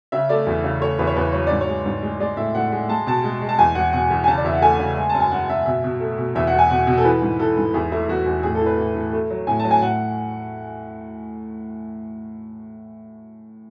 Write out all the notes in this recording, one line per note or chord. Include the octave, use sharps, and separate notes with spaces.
C#3 E5
A3 D5
E2
C#3
A3 C#5
E2 B4
C#5
E2 B4
F#3 C#5
G#2 D5
C#5
G#3
G#2
G#3
G#3 D5
A2 E5
A2 F#5
G#3
G#3 A5
B2 A5
G#3
G#3
A5
E2 G#5
E2 F#5
B2 F#5
E2
G#5
C#3 A5
D5
E2 E5
F#5
A3 G#5
C#3
G#3
A5
F#2
G#5
F#2 F#5
F#2 E5
B2 E5
B2
A3
B2
E2 E5
F#5
E2
G#5
B2 F#5
B2
A4
E3 B4
G#2
E3 A4
G#2
E2 G#4
A3 E4
E2 F#4
E2
A2 G#4
A4
E3 B4
A2
A2
A3
F#3
A2 G#5
A5
F#3
G#5
A2 F#5